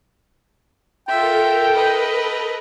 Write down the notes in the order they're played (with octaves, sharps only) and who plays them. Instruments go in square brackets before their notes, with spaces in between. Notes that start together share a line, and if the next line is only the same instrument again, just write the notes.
[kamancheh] F4 E5 [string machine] A4 A#4 [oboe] G5
[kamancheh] B4 D#5